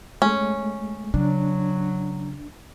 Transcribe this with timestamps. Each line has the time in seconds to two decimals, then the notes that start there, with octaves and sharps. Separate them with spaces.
0.22 G#3 A3 C#4
1.14 C#3 F#3 D4